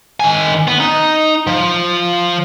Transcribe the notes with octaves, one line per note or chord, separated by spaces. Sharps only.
D#3 G#5
B3
D#4
F3